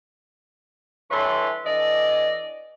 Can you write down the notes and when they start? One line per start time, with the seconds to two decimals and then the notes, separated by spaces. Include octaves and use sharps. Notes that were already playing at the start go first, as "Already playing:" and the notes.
1.11 G2 E3 A4 B4 C#5 C6
1.66 E3 D4 A4 D5 D#5